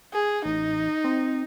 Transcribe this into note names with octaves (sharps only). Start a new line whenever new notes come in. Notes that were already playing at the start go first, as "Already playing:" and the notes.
G#4
A1 D#4
C4